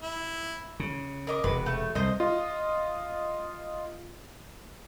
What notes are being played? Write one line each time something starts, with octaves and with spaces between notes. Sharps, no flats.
E4
C#3
A#4 D#5 D6
E1 C3 B4
A3
C2 C5 D#5
F4 D#5